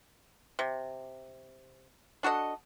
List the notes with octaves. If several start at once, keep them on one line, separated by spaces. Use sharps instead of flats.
C3
D4 F#4 A4 D#5